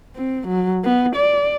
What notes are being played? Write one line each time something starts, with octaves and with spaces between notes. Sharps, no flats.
C4
F#3
B3
D5